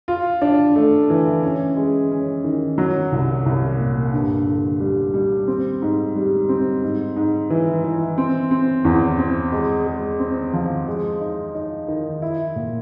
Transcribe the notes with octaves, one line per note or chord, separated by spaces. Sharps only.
F4
D4
A3
E3
C#4
G#3
C#4
D#3
F#3
C2
C2
A#2
G2
D3
G3
G3
C4
G#2
G3
C4
G#2
G#2
E3
E3
C4
C4
E2
C4
G#3
G#3
C4
F3
G#3
D#4
D#4
D#3
E4
A#2